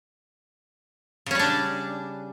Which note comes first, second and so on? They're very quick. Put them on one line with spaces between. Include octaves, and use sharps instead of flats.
C#3 C#4 G3 D4